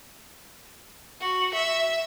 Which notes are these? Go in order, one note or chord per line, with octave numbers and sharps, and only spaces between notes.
F#4
E5